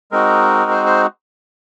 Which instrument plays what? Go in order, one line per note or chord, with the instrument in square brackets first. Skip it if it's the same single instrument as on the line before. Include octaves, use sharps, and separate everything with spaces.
[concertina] G#3 C4 D#4 F#4 A#4
C5
C5